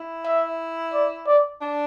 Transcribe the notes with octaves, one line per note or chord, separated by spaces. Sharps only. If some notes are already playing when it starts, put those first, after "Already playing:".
Already playing: E4
E5
D5
D5
D4